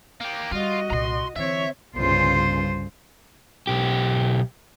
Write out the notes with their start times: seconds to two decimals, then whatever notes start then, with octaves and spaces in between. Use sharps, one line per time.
0.20 A#3 G4
0.51 G3 F4 F#4 D#5
0.90 C2 A#2 A#5 C6
1.36 D3 E3 C4 C#5 E5
1.96 G1 C2 C#3 F4 C5
3.67 B1 G4